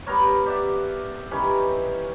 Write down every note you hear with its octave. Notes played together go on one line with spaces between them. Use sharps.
G3 B3 A#4 C#5
G4 D5 E5 F#5
D#3 E3 G3 C#4